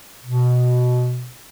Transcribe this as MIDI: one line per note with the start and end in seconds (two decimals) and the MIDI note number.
0.24 1.30 47